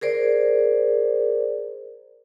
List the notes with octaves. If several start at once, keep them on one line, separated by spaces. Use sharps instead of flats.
G#4 A#4 C5 D5